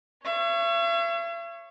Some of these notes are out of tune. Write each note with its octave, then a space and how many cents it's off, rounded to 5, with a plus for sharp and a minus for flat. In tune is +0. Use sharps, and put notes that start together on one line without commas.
C#5 +0 E5 +45